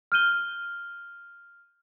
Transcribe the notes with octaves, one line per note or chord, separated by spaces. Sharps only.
F6 G6 D#7 G7